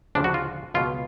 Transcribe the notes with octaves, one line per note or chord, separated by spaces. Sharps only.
D2 C#3 F3 D4
F#4
F4
C#2 B2 F4